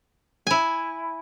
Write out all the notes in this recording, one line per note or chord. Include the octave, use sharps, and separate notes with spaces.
E4 G#5